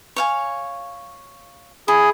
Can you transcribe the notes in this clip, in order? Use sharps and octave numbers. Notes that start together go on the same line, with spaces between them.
C#5 F5 G#5
E4 G#4